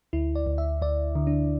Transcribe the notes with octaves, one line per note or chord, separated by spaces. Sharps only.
D2 E4
D5
D2
E5
D2 D5
D3
D4